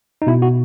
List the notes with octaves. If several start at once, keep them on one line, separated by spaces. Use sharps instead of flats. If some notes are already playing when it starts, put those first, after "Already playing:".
D#4
B2 E4
F#4